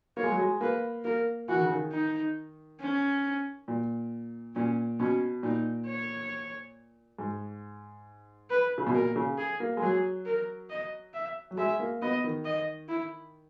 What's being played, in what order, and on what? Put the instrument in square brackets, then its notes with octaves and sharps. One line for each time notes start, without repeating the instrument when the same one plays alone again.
[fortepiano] A#3 [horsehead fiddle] C#5
[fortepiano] G#3
F#3
G#3
[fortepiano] A#3 [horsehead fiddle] B4
[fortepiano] A#3 [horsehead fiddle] A#4
[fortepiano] E3 [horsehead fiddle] F#4
[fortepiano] D#3
C#3
D#3
[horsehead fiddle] D#4
C#4
[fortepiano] A#2
[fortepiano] A#2 [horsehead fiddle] C#4
[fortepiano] B2 [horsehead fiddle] C#4
[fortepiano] A#2 [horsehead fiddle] D#4
[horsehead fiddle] C#5
[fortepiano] G#2
[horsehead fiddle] B4
[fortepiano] C#3
B2
[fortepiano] A#2 [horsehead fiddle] A#4
[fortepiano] C#3
[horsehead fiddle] G#4
[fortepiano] A#3
G#3
[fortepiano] F#3 [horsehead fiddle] G#4
[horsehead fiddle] A#4
D#5
E5
[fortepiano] F#3
[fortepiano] G#3 [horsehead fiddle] E5
[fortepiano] A#3
[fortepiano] B3 [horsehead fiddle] D#5
[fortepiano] D#3
[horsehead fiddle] D#5
E4